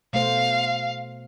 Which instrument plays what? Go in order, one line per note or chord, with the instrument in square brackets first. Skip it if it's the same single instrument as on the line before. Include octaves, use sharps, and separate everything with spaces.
[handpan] B2 A3 C5 [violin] F5